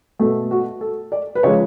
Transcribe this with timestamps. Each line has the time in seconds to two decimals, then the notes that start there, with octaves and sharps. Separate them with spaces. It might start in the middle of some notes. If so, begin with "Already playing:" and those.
0.19 B2 A3 A4
0.51 F#4
0.81 A4
1.12 D5
1.35 B4
1.43 C#3 F3 G#3 C#5